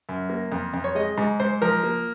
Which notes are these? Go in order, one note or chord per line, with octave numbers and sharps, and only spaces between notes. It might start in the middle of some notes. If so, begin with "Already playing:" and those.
F#2
A#3
F2
F2
C#5
G#3 D#5
G#2
G#2 C5
F3 A#4
A#3